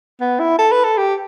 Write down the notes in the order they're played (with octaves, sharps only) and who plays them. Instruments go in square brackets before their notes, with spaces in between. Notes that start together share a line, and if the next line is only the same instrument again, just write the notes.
[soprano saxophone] B3
E4
A4
B4
A4
G4